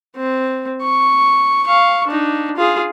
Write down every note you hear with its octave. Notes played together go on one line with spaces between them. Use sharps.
C4
C#6
F5 C#6
D4 D#4
F4 G#4